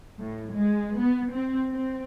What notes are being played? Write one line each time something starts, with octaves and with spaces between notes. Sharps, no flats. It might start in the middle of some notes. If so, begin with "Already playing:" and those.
A2
G#3
B3
C4
C4